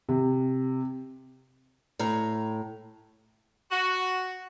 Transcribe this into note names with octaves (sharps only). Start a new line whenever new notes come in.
C3
A2 A#5
F#4